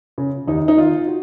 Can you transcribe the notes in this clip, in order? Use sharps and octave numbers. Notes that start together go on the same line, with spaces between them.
C#3
D#2 D#4
D#4
D#3 F4
F#4